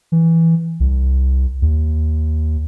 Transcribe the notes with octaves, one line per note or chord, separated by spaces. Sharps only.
E3
C2
D#2